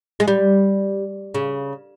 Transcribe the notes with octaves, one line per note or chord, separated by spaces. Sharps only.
G#3
G3
C#3